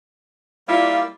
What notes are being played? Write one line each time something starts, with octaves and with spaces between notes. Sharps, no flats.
G3 A#3 E4 F4 D5